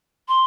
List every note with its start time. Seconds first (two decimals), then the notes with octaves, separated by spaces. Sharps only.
0.28 C6